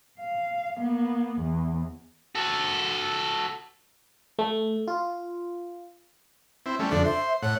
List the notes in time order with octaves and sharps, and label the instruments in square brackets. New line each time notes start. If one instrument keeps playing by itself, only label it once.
[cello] F5
A#3 B3
E2
[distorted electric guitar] F#4 A4
[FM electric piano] A3
F4
[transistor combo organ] C4 E4
G3 A3 C#4
[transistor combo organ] F2 D3 D4 [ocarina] A4
[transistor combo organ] C5 [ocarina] E5
[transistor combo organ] A2 F#5 [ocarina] C#5